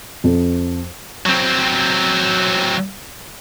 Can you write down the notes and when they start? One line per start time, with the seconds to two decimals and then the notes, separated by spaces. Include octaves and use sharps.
0.24 F2
1.26 F#3 C4